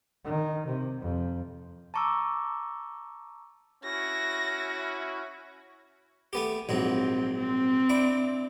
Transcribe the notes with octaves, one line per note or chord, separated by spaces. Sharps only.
D#3
C3
F2
A5 A#5 C#6 D6 E6
C#4 E4 F#4 A#6
A3 B3 G4
A#1 G#2 F#3 C4
C4
D4 E4